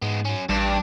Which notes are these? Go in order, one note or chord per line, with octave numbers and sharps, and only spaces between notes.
G#2 G#3 B3
F#3 C#4
A1 G2 D4